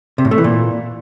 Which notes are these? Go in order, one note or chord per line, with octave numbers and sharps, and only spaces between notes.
C3
A2
A3
E3
A#2